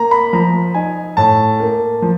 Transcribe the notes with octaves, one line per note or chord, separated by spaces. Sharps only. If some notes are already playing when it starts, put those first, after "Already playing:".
Already playing: A#3 A#5
B5
F3 A#5
D#4 G#5
A2 A5
A#3
F3